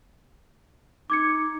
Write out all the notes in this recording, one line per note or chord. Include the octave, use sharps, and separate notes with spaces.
D#4 D6 G#6 C#7